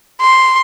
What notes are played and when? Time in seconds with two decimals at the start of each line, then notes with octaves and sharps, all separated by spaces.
0.21 C6